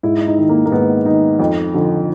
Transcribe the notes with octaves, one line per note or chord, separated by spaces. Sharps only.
G#2 E4
D#4
D#3
A#3
A#3
G#2 B3
D#3 D#4
F2
D3 F3